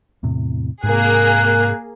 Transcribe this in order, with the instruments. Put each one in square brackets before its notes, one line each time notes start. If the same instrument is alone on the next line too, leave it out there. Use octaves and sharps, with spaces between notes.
[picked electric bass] E2 A2 C3
[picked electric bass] G#2 C3 [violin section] A#3 G#4 [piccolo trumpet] F#6